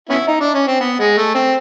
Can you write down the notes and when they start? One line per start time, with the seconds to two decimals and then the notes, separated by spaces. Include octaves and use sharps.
0.10 B3 C#4 E4
0.28 D#4
0.41 D4
0.55 C#4
0.68 C4
0.81 B3
1.00 G#3
1.18 A3
1.35 C4